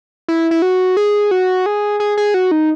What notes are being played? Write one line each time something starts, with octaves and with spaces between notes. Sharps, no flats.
E4
E4
F#4
G#4
F#4
G#4
G#4
G#4
F#4
D#4